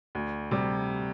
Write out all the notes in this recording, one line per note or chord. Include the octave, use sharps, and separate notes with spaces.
D2
C3 G3